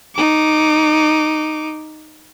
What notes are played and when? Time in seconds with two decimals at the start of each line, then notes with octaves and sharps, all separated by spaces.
0.15 D#4 D6